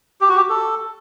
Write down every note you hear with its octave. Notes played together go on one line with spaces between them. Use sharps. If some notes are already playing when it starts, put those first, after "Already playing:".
G4
F#4
G4
A4